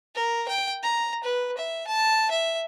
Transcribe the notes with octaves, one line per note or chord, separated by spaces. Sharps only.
A#4
G5
A#5
B4
E5
A5
E5